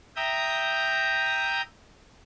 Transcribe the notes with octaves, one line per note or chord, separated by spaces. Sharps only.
E5 G5 A#5 D#6 G6